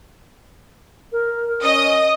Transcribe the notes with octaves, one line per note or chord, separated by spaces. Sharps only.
A#4
C#4 D#5 D#6